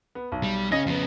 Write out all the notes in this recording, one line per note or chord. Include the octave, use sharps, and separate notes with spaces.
B3
B1
G3
C#3 C#4 D#5 A#6
F2 B3